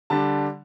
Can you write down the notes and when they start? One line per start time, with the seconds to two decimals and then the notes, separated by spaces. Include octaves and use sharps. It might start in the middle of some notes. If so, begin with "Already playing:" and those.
0.10 D3 G3 D4 A5